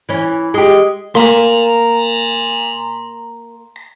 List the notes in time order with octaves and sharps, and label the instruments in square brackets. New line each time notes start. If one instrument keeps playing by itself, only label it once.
[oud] E3 C#4
G#3 G4
[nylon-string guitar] A#3 [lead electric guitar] A#5 C6